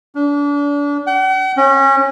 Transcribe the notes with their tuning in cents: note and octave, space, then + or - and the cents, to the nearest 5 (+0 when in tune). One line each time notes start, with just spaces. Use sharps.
D4 -35
F#5 +45
C#4 -25